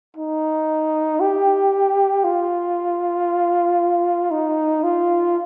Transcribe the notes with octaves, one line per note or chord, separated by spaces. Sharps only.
D#4
G4
F4
D#4
F4